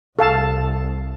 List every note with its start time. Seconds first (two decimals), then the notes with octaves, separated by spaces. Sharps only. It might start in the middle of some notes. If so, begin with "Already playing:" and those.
0.19 C2 A4 F5 A5